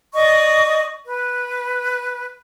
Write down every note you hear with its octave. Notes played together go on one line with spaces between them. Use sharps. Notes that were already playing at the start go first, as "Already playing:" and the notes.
D5 D#5 C#6
B4